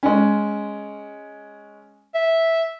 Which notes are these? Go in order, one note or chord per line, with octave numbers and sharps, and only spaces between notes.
G#3 C#4
E5